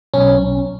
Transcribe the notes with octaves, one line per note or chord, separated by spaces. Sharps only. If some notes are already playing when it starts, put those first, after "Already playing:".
B1 C#4
B1